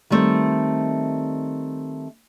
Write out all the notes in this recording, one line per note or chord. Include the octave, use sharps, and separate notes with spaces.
D#3 G3 A3 C4